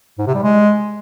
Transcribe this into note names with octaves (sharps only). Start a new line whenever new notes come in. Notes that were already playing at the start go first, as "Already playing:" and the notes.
G#2
C3
G3
G#3